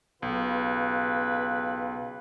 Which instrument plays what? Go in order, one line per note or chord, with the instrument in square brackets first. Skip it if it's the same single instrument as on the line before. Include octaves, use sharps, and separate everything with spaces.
[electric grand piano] B1 [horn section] C#3 F4 B4